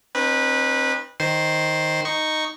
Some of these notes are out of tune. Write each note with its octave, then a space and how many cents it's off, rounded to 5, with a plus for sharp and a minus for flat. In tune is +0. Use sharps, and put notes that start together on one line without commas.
C4 +30 D#4 -40 B4 -15
D#3 +0 C5 +0 C6 +0
D#4 -5 C#6 -5